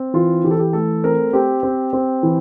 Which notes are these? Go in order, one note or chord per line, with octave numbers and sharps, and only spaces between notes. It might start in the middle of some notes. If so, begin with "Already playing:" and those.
Already playing: C4
E3 F4
E3 G4
A4
G4
A3 A4
C4 A#4
C4 G4
C4
C4
E3